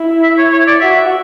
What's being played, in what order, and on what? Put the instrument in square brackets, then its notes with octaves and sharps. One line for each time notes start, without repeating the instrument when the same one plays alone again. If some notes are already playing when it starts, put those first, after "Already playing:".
Already playing: [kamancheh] E4
[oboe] E5
C#5
C#5
D5
[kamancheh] F#4 [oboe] E5